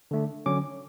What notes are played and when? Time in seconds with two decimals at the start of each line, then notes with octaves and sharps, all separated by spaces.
0.11 D3 A3 D4
0.46 D3 F#3 C#4 D6